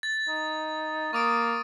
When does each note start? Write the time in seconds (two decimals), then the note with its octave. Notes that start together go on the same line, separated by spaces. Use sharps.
0.03 A6
0.28 D#4
1.13 A#3 C#6 D#6 D7